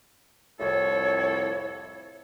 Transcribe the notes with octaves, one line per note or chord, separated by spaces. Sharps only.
C2 F2 A2 A4 C#5